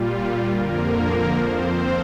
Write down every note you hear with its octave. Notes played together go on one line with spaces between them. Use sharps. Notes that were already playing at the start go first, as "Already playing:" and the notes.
Already playing: A#2 G3 F4
F2 D3 F3 A#3 A#4
F2 F3 C4 C5